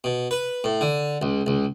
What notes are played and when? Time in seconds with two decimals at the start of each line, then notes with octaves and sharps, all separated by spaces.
0.04 B2
0.31 B4
0.64 A2
0.81 D3
1.22 C#2
1.47 C#2